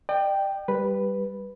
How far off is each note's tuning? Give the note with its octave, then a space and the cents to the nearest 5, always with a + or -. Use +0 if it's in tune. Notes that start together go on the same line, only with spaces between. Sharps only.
D5 +45 G5 +0
G3 +0 B4 +0